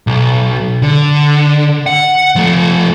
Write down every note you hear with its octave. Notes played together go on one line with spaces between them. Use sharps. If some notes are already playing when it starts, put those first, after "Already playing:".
B1
D3
F#5
F3 A3